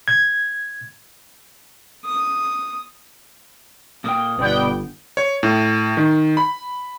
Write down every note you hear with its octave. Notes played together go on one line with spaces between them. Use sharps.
G#6
D#6
A#2 A#3 G5 D#6
G1 B2 B3 D5 G5
C#5
A2
D#3
B5